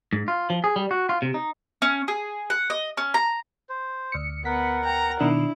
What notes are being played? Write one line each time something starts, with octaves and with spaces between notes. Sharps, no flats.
G#2
F4
F3
G#4
G3
F#4
F4
C3
D#4
C#4
G#4
F#5
D#5
C#4
A#5
C5
D2 C#7
B3 A#4 F#5 B6
G5 A#5
B2 D#3 D4 E4